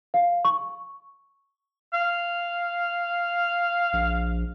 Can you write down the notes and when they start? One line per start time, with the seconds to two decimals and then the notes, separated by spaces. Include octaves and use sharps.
0.14 F5
0.45 C#6
1.94 F5
3.93 A#1